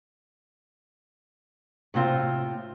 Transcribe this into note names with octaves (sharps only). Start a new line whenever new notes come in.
A2 C3 C4 F4